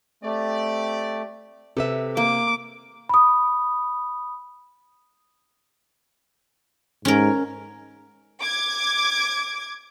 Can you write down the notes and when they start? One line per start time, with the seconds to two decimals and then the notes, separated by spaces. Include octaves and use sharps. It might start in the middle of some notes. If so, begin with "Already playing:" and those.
0.24 A3 C4 G4 D5
1.77 C3 A4 B4 E5
2.17 A#3 D6
3.09 B5 D#6
7.05 G#2 C#4 A#4
8.41 D6 G#6